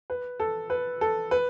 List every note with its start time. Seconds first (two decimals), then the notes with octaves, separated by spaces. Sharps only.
0.10 B4
0.40 A4
0.70 B4
1.01 A4
1.31 B4